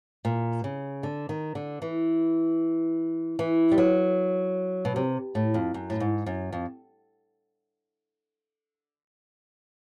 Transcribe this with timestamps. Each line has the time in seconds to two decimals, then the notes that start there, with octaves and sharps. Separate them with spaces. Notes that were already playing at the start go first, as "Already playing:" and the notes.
0.25 A#2
0.64 C#3
1.03 D3
1.29 D#3
1.55 D3
1.82 E3
3.39 E3
3.72 G3
3.78 F#3
4.85 B2
4.96 C3
5.35 A2
5.54 F2
5.74 F#2
5.90 A2
6.00 G#2
6.26 F#2
6.52 F2